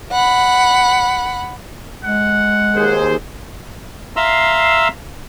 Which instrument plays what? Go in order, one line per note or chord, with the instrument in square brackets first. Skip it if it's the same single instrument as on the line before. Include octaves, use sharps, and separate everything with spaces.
[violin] F#5 B5
[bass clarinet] G#3 [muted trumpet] F#5
[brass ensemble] D#2 G#4 C5
[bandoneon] E5 F5 A#5 C6 E6